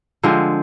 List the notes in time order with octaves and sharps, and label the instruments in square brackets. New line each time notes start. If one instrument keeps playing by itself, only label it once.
[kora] D3 F3 G#3 C4